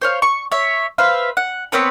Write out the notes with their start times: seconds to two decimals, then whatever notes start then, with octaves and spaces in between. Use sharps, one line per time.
0.02 C5 C#5 F5
0.22 C#6
0.52 C#5 E5
0.98 B4 C5 E5 F5
1.37 F#5
1.72 B3 C4 B4 C#5